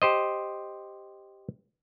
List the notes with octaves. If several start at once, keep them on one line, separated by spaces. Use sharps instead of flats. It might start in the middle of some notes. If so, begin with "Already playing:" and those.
G4 C5 D#5